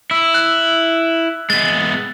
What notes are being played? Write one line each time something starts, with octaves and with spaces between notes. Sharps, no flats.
E4 E6
F#6
G#3 B3 A6